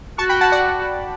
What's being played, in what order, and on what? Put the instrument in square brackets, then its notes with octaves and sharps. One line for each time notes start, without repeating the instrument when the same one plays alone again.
[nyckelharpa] F#4 [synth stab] A5 C#6
[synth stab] G5 B5
F#5 A5
D5 F#5